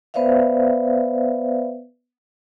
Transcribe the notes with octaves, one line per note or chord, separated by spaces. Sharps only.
B3 B4 C5 D5 E5 F5